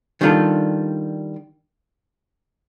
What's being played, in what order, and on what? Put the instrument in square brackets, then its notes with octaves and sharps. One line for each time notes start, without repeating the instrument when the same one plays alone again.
[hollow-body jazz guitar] D#3 G3 D4 F4 A4